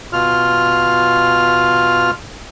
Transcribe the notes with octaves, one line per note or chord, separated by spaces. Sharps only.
B2 F4 F6